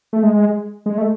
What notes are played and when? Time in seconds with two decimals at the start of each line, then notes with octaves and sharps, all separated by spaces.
0.13 A3
0.23 G#3
0.86 G#3
0.98 A3